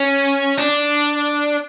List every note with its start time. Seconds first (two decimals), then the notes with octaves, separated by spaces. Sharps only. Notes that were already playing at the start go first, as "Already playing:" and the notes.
Already playing: C#4
0.58 D4